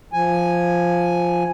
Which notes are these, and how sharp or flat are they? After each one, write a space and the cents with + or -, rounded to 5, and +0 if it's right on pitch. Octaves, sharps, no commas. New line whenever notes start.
F3 +0 G#5 +0